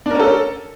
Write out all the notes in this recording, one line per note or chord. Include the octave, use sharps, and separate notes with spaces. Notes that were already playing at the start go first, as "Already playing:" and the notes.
C#4 D4 A4 A#4